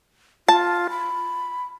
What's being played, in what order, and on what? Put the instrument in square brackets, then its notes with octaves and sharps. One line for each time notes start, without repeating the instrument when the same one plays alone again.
[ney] F4 [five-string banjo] A5
[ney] B5